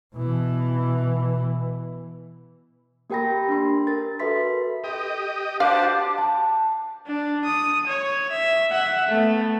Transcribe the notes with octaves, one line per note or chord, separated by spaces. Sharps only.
B2 E3
A#3 G4 A#4 G5 B5 A#6
D4 C6
A#4 A6
F#4 A4 B4 E5 C6 B6
G4 D#5
D4 F#4 G4 C5 D5 F5 A5 D6
A5
D4
D#6
C#5
E5
E5 F#5
A3 B3